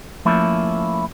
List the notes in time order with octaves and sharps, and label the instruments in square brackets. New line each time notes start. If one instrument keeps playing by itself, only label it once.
[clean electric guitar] F3 A3 A#3 C#4 E4 F4